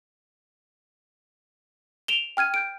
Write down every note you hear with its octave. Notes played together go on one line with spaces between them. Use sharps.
D7 E7 F7 G7
G5 F6 G#6 D#7
G6 D7